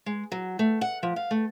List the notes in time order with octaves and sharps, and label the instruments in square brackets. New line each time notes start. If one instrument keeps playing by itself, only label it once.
[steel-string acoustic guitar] G#3
F#3
A3
F#5
F3
F5
A3